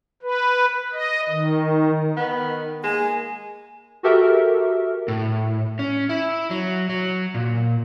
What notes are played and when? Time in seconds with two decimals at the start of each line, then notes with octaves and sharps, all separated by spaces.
0.22 B4
0.93 D#5
1.29 D#3
2.17 D#3 B3
2.84 G#3 A#3 G#5
4.03 F#4 G4 A4 A#4 E5
5.08 A2
5.79 C#4
6.09 E4
6.50 F#3
6.89 F#3
7.34 A#2